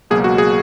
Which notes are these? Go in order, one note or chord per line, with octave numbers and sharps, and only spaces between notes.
C#2 B2 F#3 A#3 G#4
F#4
G#4